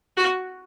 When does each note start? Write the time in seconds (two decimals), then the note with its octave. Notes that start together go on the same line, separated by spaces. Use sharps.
0.17 F#4